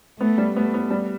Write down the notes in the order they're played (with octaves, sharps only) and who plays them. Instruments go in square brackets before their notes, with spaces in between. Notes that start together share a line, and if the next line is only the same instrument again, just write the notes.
[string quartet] A3 [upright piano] B3
[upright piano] G3
[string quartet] A3 [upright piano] B3
[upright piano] B3
G3